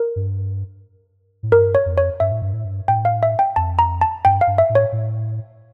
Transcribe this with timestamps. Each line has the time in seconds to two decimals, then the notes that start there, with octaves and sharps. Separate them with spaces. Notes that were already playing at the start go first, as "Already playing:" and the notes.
Already playing: A#4
0.16 G2
1.43 A2
1.52 G2 A#4
1.75 C#5
1.86 F2
1.98 C#5
2.20 G2 E5
2.31 A2
2.42 G2
2.53 A2
2.65 G2
2.88 A2 G5
3.05 F5
3.23 E5
3.39 G5
3.56 F2 A5
3.79 A#5
4.01 A5
4.25 G2 G5
4.41 F5
4.47 G2
4.58 E5
4.69 A2
4.75 C#5
4.92 A2